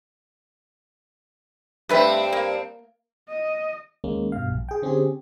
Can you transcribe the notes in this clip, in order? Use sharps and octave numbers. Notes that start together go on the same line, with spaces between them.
G2 A3 C4 B4 E5
A#3
D#5
D#2 G#3 A#3 C#4
G2 B2 F5
A#1
G#4 G5
D3 C4 C#4 G4 G#4